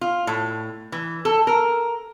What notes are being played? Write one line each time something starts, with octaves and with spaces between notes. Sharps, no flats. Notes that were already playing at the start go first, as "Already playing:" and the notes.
F4
A2
E3
A4
A#4